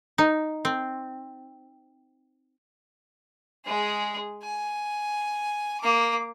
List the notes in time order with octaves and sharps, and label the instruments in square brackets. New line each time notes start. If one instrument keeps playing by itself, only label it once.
[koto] D#4
C4
[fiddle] G#3 G#4
G#5
A#3 D6